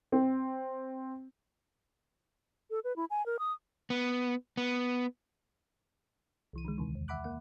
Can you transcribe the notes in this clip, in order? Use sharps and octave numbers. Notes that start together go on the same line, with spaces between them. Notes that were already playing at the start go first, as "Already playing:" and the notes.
C4
A4
B4
E4
G#5
A#4
D#6
B3
B3
C2 E3 D#7
D3 D#3 G#3
D2 C3 D#3 E3
E2
E5 F#5 B5 D6 F#6
A#3 F#5